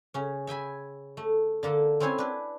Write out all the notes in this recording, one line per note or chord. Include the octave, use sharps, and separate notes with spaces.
C#3 C#4
E5 G5 G#5 B5
A3
D3 A#3 A4
C4 C#4 E4 C5 C#5 G#5
D4 B4